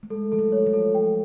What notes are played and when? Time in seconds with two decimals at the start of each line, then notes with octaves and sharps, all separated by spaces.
0.03 A3
0.10 G#3 A4
0.32 F3 A4
0.39 F#3
0.52 C#5
0.67 F3
0.73 A4
0.95 G5